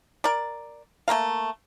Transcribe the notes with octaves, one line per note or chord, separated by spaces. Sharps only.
A#4 D5
A3 A#3 A#4 F5